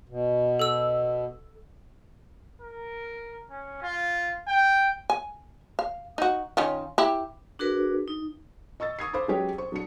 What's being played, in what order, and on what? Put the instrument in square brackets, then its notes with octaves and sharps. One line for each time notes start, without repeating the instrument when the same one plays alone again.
[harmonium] B2
[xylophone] A4 E6
[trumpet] A#4
C#4
F4
G5
[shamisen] G#5
F5
D#4 F#4
D#3 C#4 F4
E4 G4
[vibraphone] D4 F#4 G#4 A#4 B4
D#4
[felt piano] D#5 C#6 E6 A6
C#6 D#6 G#6 C7
A4 C5 F5 B5 D6
F#3 G#3 C#4 G4 B4 C#5
C5 C#6
F#3 D4 C#7